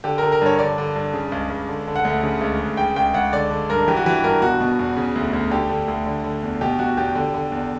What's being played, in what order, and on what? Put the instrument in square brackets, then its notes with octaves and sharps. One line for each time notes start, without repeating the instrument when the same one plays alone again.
[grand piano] D3 G4
D3 A#4
A#4
G2 C#5
D3 D5
D3
G2
C#3
C#2
C#2
D3
D3
F#5
D2
C#3
C#2
C#2
C#3 G5
C#2 G5
C#2 F#5
D3 D5
D3
G2 A#4
E3 G4
F#4
E3 G4
G2 A#4
B2 F#4
B2
E2
C#3
D2
D2
D3 G4
D3
D2
D3
D3
E2
B2 G4
B2 F#4
E2 G4
D3
D3
E2